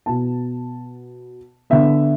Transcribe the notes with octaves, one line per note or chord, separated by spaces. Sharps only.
B2 B3 A5
D3 B3 E5